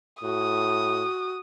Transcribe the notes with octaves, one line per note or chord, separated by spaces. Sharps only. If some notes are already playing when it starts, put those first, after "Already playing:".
A2 F#4 D#6